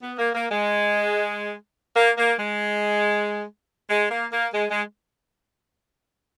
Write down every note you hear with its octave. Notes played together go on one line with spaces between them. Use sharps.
B3
A#3
A#3
G#3
A#3
A#3
G#3
G#3
A#3
A#3
G#3
G#3